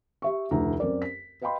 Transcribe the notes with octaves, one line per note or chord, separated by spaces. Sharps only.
G4 E5 C#6
F1 D2 E4 A#5
F#2 C4 A#4 D5
B6
B4 D#5 F5 G5 B5 C6